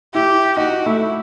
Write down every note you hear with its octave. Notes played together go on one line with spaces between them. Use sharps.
E4 G4
D#4 F#4
A3 E4